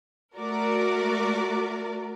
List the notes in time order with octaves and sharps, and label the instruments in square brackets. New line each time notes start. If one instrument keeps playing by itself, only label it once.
[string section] A3 F#4 A#4 D5